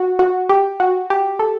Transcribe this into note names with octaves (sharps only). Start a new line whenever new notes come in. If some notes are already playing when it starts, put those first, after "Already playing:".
Already playing: F#4
F#4
G4
F#4
G4
A4